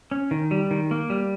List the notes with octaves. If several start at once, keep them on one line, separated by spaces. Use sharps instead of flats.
C#4
D#3
G3
D#3
A#3
G3